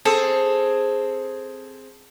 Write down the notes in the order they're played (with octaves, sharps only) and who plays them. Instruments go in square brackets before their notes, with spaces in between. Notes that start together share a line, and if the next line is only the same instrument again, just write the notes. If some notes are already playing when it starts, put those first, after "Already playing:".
[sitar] C4 G#4 [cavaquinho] A4